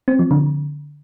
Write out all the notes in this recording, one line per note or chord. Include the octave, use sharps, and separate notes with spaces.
C4
F3
D3